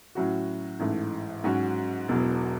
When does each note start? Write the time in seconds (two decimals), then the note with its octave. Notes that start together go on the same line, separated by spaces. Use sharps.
0.15 A2 F#3 C#4 F#4
0.79 A1 G#2 E3 A3
1.44 G#2 F#3 C#4 F#4
2.08 E1 E2 B2 F#3